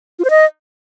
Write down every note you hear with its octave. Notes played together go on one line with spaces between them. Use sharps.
F4
C5
D#5